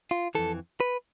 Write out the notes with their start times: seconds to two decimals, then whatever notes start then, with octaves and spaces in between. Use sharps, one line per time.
0.11 F4
0.35 F2 E3 A4
0.80 B4